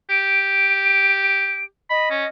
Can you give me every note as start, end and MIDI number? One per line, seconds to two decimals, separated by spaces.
0.10 1.65 67
0.10 1.64 98
1.90 2.28 75
1.90 2.09 83
2.11 2.25 61